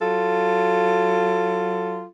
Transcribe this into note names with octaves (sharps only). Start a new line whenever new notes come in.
F#3 F4 A4